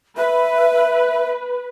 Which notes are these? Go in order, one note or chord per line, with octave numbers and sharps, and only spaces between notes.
B4 E5